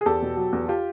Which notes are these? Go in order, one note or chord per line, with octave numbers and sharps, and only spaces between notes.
G#4
E2 G4 A4
B2
F#3
E2
F4 G4